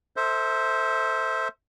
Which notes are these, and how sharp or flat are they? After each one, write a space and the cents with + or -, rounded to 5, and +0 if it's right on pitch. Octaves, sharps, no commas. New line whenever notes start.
A4 +25 C5 +0 E5 -30